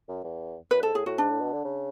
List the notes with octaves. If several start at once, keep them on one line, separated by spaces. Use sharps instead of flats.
F#2
E2
F#2 B4
G#2 A4
A2 G#4
A2 F#4
G#2 D4
A2
B2
D3
C#3